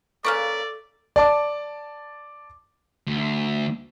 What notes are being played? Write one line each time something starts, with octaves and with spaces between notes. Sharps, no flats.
C#3 A#3 A4 B4 D5 C#6 F6
D5 A5 D6
D2